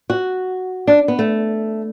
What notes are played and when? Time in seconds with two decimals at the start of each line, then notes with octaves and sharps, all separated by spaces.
0.10 F#4
0.87 D4
1.08 B3
1.19 A3